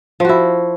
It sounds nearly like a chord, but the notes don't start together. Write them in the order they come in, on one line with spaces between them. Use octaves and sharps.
F3 F#4 E4